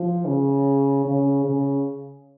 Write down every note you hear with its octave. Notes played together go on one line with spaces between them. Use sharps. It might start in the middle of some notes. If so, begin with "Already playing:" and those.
Already playing: F3
C#3
C#3
C#3